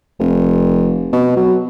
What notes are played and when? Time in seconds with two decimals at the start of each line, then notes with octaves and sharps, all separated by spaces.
0.20 F1
1.13 B2
1.37 F#3